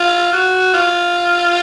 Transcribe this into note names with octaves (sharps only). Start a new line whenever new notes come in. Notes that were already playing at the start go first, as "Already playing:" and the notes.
Already playing: F4
F#4
F4